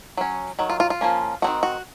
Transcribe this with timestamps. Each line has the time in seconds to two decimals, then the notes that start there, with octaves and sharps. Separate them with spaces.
0.17 F#3 C#4
0.59 D#3 F#3
0.70 F4
0.80 F4
0.90 F4
1.01 F3 A#3 C#4
1.42 F#3 C4 D#4 F#4
1.47 D#3
1.63 F#4